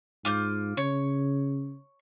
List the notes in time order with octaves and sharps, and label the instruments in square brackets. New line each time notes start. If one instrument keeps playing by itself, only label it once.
[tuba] G#2 [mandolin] F4 D6 G6
[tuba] C#3 [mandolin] C#5